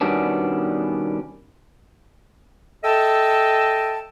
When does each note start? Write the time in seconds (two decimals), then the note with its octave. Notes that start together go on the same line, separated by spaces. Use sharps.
0.01 B2 D#3 G3 B3 C#4 D4
2.84 A4 D#5 E5 G5 A5